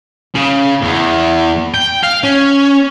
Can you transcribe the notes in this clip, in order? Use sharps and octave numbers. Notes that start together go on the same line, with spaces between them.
C#3
E2
G5
F5
C#4